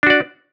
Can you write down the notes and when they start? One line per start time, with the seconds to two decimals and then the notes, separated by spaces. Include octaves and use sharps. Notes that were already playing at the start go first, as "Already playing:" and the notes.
0.03 D4
0.07 F#4
0.10 D5